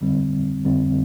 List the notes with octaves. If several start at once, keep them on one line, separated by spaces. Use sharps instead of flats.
F2 D3 G3 C4
F2 D3 G3 C4